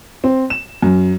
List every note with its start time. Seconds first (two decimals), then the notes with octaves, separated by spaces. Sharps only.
0.24 C4
0.50 E7
0.83 F#2